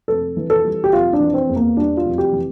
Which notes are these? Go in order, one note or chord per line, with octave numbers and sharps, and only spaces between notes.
F1 A4
E3
A4
G3
G4
F1 F4
D4
E3
C4
E2
A#3
G3 D4
F4
F1
G4
E3